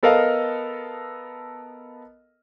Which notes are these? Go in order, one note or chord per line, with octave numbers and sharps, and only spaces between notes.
B3 A4 A#4 D#5 F5